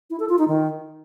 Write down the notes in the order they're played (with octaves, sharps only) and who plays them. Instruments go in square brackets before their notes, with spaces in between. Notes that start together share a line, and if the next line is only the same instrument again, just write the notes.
[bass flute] E4
A4
F4
D#4
D#3